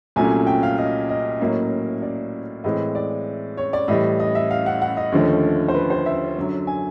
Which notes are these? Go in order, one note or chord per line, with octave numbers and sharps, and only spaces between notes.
C2 A#2 F#3 A3 C#4 G#5
G5
F5
D#5
D#5
A2 F#3 A#3 C#4
D5
A2 E3 G#3 C4 D#5
D5
C#5
D5
A2 E3 G3 D#5
D#5
E5
F5
F#5
F#5
D#5
D#2 D3 F3 A3 C#4
C5
B4
C5
E5
F#2 D3 F#3
G#5